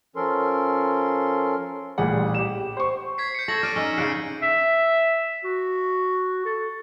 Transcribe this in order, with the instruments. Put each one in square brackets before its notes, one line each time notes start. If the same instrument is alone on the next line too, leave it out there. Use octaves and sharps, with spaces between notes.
[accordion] F3 C#4 A4 A#4 C6
[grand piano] A1 A#2 G3 G#4 F#5
G4 E7
C5 C#6
[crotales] G#6 B6 C7
G6 C#7
[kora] A4 C#5 [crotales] C#6 A#6 F#7
[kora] D5 [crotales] F6 A#6 D#7
[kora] C#4 D#4 [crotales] E6
[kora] C#3 D5 F#5 [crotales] C7 D7
[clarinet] E5
F#4
A4